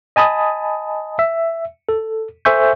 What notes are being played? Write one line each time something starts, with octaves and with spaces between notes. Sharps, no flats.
D#5 G#5 A5 B5 D#6
E5
A4
A4 C5 E5 G#5 C#6 G6